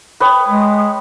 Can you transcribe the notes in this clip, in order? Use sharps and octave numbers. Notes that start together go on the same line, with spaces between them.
B4 C#5 G5 D#6
G#3